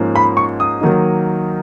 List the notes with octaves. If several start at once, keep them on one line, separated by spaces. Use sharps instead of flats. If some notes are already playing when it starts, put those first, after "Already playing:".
Already playing: G#2 F3 A#3 C#4
B5
C#6
D#6
D#3 F#3 A#3 D#4